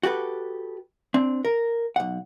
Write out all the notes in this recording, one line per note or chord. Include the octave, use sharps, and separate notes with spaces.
F#4 G4 A4 B4
C4 D4
A#4
B1 F#5